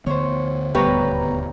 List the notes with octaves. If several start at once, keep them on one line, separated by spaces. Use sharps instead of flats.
D2 D3 B3 C5 C#5
D#1 D2 G2 B3 G4 B4 C#5 A#5